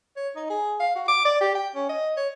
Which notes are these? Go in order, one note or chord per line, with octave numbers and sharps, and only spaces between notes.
C#5
D#4
G#4
F5
F#4
D6
D5
G4
G5
C#4
D#5
C#5